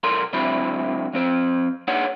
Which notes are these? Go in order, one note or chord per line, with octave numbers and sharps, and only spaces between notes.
B1 A4 A#4 A#5 C6
C#2 D3 F#3 C4 E4 B5
F3 C4 C5
A#3 D4 D#4 G#4 C#5 F#5